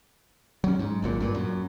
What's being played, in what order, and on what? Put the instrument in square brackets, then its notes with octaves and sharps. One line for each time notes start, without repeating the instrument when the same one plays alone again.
[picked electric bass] F#3 C#4
G#2
G#1 F#2 A#2
G2 A#2
F#2